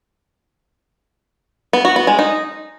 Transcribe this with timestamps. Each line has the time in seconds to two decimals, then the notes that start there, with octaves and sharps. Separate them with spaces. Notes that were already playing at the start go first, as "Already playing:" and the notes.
1.73 B3
1.85 F#4
1.96 B3
2.07 G#3
2.19 D#4